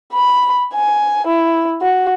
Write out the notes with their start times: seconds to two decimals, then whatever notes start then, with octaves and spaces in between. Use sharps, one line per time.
0.12 B5
0.73 G#5
1.27 E4
1.82 F#4